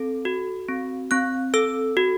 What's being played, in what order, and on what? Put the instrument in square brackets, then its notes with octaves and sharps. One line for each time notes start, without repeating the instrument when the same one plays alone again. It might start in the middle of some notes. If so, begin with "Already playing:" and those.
Already playing: [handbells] C4 A4
F#4
C4
C4 F#6
A4 E6
F#4